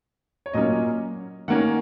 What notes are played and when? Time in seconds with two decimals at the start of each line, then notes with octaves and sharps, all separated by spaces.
0.46 C#5
0.54 A#2 F#3 A#3 C#4 D#5
1.48 D#3 A#3 C#4 F#5